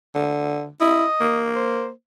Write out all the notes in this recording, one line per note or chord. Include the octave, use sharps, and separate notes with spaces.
D3
E4 D#5
A#3
C5